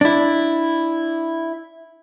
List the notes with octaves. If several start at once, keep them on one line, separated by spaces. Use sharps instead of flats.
D4 E4